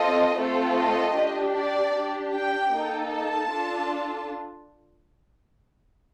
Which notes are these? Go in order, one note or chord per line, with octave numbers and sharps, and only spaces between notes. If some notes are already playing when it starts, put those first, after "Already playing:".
Already playing: C4 F4 A4 D#5
A3 C4 F4 A4
D#5
D4 G4
D5
D4 G4
G5
A#3 D#4 A4
A5
D4 F4 A4